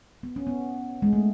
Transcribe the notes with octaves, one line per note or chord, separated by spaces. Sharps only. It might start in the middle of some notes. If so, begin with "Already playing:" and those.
B3
C#4
B3
G#3
A3